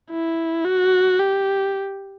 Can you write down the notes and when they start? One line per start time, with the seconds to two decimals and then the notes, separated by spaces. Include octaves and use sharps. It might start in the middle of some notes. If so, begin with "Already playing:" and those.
0.11 E4
0.65 F#4
1.19 G4